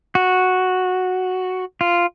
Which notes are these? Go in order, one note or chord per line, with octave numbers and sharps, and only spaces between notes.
F#4
F4